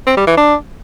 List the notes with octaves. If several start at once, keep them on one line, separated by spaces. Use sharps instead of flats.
C4
G3
E3
D4